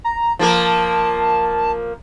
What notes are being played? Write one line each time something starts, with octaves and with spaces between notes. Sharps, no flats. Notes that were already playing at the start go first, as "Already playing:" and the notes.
A#5
F3 A#3 A#4 A5